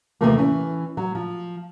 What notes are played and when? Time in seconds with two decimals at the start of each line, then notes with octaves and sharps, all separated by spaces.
0.21 D#2 C3 E3 F3 A3 A#3
0.38 E3 C#4
0.97 F#3
1.15 F3